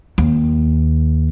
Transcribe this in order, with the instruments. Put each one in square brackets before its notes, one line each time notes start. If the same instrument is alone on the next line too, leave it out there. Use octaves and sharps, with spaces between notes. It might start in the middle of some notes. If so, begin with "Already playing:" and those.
[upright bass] D#2